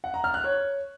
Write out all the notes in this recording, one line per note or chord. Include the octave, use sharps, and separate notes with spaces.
F#5
A#5
F6
F#6
C#5